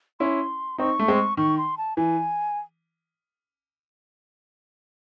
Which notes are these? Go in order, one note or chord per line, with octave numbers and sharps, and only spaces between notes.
C#4 E4 C6
C4 D#4 C#6
A3
G#3 C4
D#3 C#6
C6
A5
E3 G#5